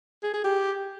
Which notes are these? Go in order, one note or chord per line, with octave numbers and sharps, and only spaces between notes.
G#4
G#4
G4